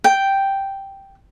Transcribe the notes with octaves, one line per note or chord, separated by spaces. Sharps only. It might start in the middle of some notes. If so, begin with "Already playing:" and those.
G5